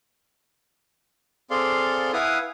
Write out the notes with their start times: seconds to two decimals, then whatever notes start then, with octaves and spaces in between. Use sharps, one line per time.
1.50 C4 G#4 A4 D5 F5 C6
2.13 E4 B4 F5 F#5 G#5 D#6